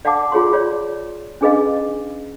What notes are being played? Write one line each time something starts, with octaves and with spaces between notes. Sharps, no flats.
D5 F5 F#5 A5 D6
F4 G#4 C#5 C6
F4 C#5 D5
C#4 D4 G#4 B4 D#5 F5